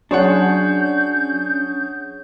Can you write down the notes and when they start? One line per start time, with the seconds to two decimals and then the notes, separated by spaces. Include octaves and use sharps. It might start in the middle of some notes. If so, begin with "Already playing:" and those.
0.11 F#3 C#4 D4 G#4 C#5 F#5 G6